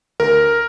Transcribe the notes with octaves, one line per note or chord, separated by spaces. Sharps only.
D2 A#4